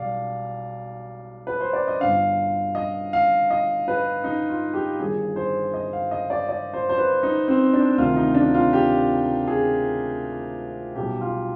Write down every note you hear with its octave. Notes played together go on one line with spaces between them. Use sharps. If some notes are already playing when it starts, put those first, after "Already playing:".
Already playing: B1 B2 G3 D5 F5
B4
C5
D5
D#5
G1 G2 D3 F5
D#5
F5
D#5
B4
D#4
F4
G4
G1 G2 D#3 G#4
C5
D#5
F5
D#5
D5
D5
C5
C5
B4
D#4
C4
D4
D2 C3 D#3 F4
D#4
D4
F4
G4
G#4
B1 B2 G3 G4
F4